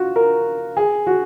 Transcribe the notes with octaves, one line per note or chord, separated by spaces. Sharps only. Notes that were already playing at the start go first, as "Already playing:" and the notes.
Already playing: F4 F#4
A#4
G#4
F#4